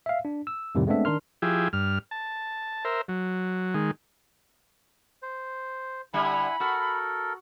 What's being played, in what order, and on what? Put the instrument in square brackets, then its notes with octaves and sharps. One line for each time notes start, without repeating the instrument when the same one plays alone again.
[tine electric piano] E5 F5
D4
E6
F2 A2 C3 D#3 G3
G#3 A3 B3 C4 D4 E5
D#3 D4 A#4 C6 F6
[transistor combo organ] F3 E4 G4 G#4
G2 F6
A5
A#4 C5 E5
F#3
D#3 G#3
[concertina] C5
[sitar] D3 G3 E5 [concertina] E4 F#5 G#5 [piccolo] B5
[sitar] F#4 [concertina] A4 A#4